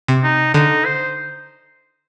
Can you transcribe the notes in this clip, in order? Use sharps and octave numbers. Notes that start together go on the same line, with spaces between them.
C3
D#4
D3 D#4
C5